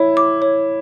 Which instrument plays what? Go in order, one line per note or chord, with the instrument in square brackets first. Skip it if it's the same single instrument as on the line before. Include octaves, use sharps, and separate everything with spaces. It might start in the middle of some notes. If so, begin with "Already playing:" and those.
Already playing: [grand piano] E4 [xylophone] C#5
[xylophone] D6
C#5